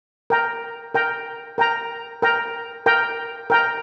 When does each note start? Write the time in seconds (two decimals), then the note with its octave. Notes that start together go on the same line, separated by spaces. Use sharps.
0.30 A#4 G5 A#5
0.94 A#4 G5 A#5
1.58 A#4 G5 A#5
2.22 A#4 G5 A#5
2.86 A#4 G5 A#5
3.50 A#4 G5 A#5